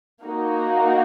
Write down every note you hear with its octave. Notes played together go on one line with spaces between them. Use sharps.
A#3 D#4 F#4